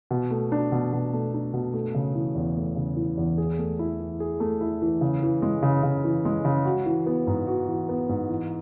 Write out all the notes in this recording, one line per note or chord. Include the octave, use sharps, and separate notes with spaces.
B2
A3
D4
B2
B2
A3
D4
B2
A3
C#3
E3
E2
A3
C#3
E3
E2
G#4
A3
E4
E3
G#4
A3
E4
E3
C#3
E3
G#3
C#3
C#3
E3
G#3
C#3
F#4
E3
B3
G#2
F#4
E3
B3
G#2
E3